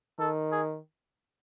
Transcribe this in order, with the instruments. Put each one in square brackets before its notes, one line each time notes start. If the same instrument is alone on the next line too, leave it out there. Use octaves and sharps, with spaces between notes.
[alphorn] D#3 [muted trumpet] A4
[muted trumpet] G#4